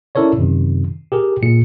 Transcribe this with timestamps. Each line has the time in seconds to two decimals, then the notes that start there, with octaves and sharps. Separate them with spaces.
0.15 C#4 E4 A4 A#4 C#5 D5
0.38 F#2 C3 D#3
1.12 G4 G#4 A#4
1.43 A#2 G#4 C#7